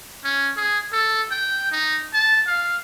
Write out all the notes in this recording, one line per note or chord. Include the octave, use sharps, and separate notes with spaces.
C#4
G#4
A4
G5
D#4
A5
F5